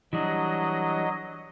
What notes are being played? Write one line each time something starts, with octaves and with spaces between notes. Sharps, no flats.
E3 F#3 G3 D4 D#5